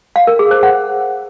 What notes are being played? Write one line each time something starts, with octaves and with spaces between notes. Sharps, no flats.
F5
A#4
G#4
C5
F#5